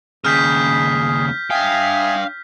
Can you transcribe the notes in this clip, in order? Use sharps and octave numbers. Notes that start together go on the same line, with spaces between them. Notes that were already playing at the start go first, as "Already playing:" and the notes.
D#2 C#3 G#4 F6 G6 B6
D4 E5 F5 G5 G#5 D#6